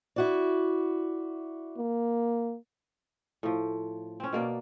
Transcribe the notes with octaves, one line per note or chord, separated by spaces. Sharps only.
E4 F#4 D5
A#3
A2 F3
C4 C#4
B2 A#3 D5